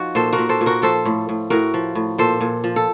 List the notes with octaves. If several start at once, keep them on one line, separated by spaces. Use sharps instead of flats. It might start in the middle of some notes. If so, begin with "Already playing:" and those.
Already playing: F3 D#4 F#4
A#2 A4 C5
F#4 A#4
A#2
A4 C5
A#2
F#4 A#4
F3 A4 C5
A2
A2
A2 F#4 A#4
F3
A2
A#2 A4 C5
A#2
F3
A4